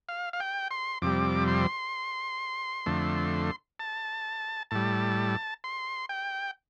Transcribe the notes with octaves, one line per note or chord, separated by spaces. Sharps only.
F5
F5
G5
C6
F2 C3 G3 D6
C6
F2 D3 A3
A5
A2 G3 A5
C6
G5